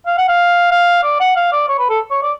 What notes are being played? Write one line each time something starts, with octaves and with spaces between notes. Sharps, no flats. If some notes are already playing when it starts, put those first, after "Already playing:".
F5
F#5
F5
F5
D5
F#5
F5
D5
C#5
B4
A4
C#5
D5